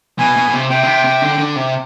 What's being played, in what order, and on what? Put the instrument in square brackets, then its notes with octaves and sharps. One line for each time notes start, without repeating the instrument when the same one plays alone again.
[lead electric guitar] B2 [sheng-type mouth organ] G#5
[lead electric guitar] B2
B2
C3
[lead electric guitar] C3 [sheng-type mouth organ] G5
[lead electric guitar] D3
C3
C3
D3
D3
C3